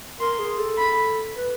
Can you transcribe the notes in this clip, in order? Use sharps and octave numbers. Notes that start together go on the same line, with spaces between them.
A#4 C6
G#4
A4
B5
B4